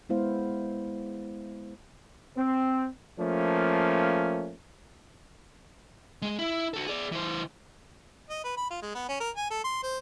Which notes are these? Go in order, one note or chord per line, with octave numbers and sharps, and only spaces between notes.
G#3 B3 E4 C5 F5
C4
F3 A3 A#3 C#4
G#3 G#4
E4
F#4 A4
G#4 D5
E3 C5
D#5
B4
B5
F4
G#3
B3
C#4
A#4
G#5
A4
C6
C5